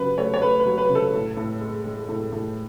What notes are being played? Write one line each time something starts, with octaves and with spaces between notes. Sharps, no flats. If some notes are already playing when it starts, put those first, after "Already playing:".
Already playing: C#3 F#3 B4
A3 C#5
C#5
A3 B4
B4
F#3
B4
C#3
A4
A2
A2
G#3
G#3
A2
A2